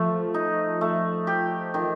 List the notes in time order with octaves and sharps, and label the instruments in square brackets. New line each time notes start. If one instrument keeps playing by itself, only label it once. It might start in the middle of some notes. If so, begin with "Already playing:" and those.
Already playing: [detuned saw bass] F3 [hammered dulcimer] A3
[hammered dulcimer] D#4
A3
G4
D#3